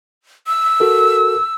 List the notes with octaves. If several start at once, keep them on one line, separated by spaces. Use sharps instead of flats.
E6
F#4 A4 A#4